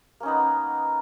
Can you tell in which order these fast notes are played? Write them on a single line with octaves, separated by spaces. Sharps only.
A#3 C#4 D#4 B3